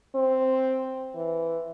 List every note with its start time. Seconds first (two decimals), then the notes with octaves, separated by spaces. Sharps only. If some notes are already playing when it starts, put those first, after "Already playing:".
0.15 C4
1.15 E3